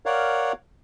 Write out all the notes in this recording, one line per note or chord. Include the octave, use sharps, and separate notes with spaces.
A#4 C#5 D5 F5 F#5